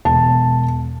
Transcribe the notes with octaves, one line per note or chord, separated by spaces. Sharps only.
E1 A5